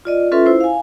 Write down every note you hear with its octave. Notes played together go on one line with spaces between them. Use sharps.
F4 D5 D#5
C#4 F4 A4 B4 E5 C6
E4 C5
F5 G#5